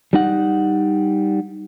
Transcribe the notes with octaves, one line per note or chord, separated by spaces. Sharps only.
G3 D#4 F#5